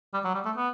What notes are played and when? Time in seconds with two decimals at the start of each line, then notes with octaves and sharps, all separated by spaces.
0.14 G3
0.25 F#3
0.35 G3
0.45 A3
0.57 B3